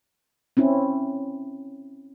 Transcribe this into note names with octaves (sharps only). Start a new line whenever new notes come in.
C4 C#4 E4